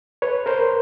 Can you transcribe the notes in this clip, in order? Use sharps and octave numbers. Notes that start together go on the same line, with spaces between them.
B4 C#5
A#4 C5